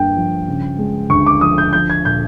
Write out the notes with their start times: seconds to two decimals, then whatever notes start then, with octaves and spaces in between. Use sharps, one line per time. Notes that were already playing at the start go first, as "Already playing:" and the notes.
Already playing: G2 D3 A#3 G5
0.16 F3
0.48 C#3
0.79 G#3
1.10 D2 C#6
1.26 D6
1.41 F3 D#6
1.58 G6
1.73 F3 G6
1.90 G#6
2.05 A#2 G6